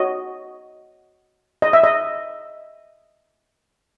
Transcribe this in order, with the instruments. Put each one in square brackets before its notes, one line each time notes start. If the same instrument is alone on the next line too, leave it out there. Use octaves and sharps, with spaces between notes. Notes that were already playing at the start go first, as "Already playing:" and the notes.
Already playing: [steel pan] F#4 C#5 D#5
D#5
E5
D#5